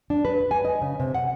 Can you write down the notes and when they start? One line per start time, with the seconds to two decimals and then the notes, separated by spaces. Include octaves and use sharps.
0.10 D4
0.25 B4
0.51 G#5
0.65 D#5
0.82 C#3
1.00 C3
1.14 F#5